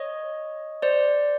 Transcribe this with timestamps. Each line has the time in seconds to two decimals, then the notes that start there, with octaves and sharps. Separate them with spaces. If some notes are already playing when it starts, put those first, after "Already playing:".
Already playing: C#5 D#5
0.82 C5 D5